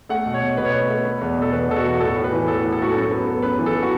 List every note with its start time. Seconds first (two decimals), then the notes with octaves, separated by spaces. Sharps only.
0.09 A3 F#5
0.26 B2
0.34 C#5
0.42 B2
0.57 B2 B4
0.65 C#5
0.73 A3 B4
0.89 A3
1.05 B3
1.21 E2
1.37 B2
1.42 A4
1.52 E2 B4
1.69 B2 A4
1.77 F#4
1.85 E2
1.94 F#4
2.00 A2 A4
2.16 A2
2.24 B4
2.32 E3
2.48 A2 A4
2.64 A2
2.72 A4
2.79 A2 F#4
2.92 F#2 A4
3.11 B3
3.27 B3
3.42 F#2 B4
3.58 E3
3.66 A4
3.83 F#4